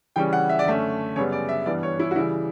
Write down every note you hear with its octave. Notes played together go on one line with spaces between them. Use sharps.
C#3 E3 G3 C#4 G5
F#5
E5
D5
F#2 D3 A3 C#4 E5
F#2 C#3 G3 B3 C#5
D5
E5
G2 E3 G3 B3 D5
C#5
E4
F#4
C#3 E3 G3 E4